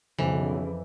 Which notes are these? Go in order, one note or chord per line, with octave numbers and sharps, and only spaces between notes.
B1 F2 C#3 E3 D5